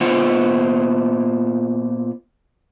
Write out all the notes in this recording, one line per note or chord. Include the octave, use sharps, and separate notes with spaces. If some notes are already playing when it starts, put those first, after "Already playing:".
A#2 B3 F4 C5 F#5